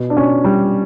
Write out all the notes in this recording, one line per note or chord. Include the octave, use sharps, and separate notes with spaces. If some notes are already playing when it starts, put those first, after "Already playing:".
Already playing: B2
D4
B2 C#4
B2 G3